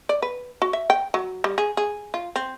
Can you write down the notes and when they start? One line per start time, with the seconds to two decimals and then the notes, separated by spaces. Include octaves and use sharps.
0.09 D5
0.22 B4
0.62 F#4
0.73 E5
0.90 G5
1.14 F#3
1.44 G3
1.58 G#4
1.77 G#4
2.14 F4
2.36 C4